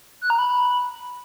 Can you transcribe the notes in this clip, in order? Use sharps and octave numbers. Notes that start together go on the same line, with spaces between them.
F#6
A#5
B5